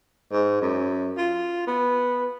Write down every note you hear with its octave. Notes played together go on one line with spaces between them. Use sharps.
G#2
F#2
F4
B3